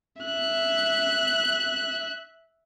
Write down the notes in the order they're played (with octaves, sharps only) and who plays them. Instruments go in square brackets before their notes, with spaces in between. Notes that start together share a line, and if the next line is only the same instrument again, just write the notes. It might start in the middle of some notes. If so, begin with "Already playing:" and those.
[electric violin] E5 F#6